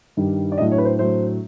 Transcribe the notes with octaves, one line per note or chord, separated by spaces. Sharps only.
G2 D#3 G3
D5
A2 F#3 A3 D4 D#5
C#5
B4
C5
A2 F#3 A3 D4 C5